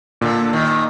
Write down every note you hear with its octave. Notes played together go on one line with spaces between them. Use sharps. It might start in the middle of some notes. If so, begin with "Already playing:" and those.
A#2 D3
D#3